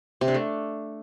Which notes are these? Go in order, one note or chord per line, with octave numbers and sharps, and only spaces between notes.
C3
D4
A3